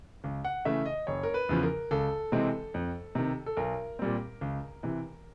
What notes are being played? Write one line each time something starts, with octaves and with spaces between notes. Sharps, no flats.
C#2
F#5
C#3 E3 A3 E5
D#5
F#1 C#5
A#4
B4
E2 C#3 F3
A#4
C#2 A4
C3 E3 G#3 C4
F2
C3 D#3
A4
B1 A#4
A#2 G3 C4
C#2
C3 E3